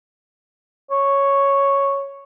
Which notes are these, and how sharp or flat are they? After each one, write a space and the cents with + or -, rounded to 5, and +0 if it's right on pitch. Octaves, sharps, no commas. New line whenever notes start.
C#5 +0